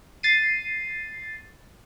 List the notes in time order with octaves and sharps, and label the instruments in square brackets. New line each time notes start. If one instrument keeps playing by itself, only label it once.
[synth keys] A6 C7 D#7